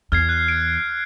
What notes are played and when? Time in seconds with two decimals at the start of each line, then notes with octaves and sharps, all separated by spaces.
0.12 E2 F6 G#6 C7
0.29 F#6
0.48 D7